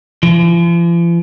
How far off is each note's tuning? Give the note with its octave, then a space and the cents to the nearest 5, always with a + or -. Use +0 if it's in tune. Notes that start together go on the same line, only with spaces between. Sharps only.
F3 -45